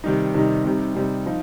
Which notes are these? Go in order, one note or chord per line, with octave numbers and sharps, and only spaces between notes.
C3 D#3 G3 D#4
C3 D#3 G3 D#4
C3 G3 C4 D#4
C3 G3 C4 D#4
F3 D#4